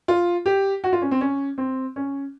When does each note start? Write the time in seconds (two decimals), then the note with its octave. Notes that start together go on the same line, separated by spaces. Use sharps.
0.08 F4
0.46 G4
0.84 F#4
0.93 F4
1.02 C#4
1.11 C4
1.21 C#4
1.58 C4
1.96 C#4